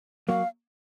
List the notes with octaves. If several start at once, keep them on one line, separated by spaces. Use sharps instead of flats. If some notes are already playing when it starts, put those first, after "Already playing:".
F#3 A#3 F5